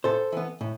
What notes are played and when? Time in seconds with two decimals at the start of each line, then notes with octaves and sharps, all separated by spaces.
0.04 A2 A4 C5
0.32 E3 B3
0.61 A2